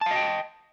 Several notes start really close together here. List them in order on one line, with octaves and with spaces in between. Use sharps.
A5 F5 D#5 G5